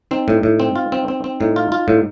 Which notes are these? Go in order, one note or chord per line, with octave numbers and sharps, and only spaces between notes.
C4 D#4
A2
A2
C4
F4
C4
C4
C4
A2 D#4
F4
F4
A2